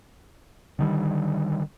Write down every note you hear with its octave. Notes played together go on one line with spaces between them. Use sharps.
D3 D#3 G3